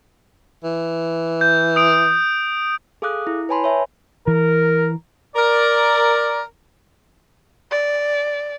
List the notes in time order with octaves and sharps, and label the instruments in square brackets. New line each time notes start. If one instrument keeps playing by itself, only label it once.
[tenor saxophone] E3
[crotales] G6
D#6 D7
[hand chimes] G#4 A4 F5 D6 D#6 F#6
E4
B4 C#5 G#5 A5 B5 C6
C#5 E5 G#5
[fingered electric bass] E3 [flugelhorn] A#4
[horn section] A#4 D5
[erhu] D5